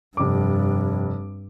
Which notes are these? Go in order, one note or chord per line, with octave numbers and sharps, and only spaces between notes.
F1 G2 D6